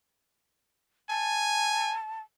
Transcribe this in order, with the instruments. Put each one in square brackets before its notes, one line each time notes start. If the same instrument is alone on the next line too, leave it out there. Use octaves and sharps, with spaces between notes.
[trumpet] G#5 [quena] A5